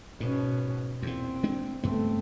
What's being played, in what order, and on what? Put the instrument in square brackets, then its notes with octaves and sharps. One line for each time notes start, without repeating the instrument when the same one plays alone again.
[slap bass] G#2 [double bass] B2 C#4
[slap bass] E2 A#2 [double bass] C4
[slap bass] G#3 D4
[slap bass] F#1 G2 B3 [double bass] A3 C4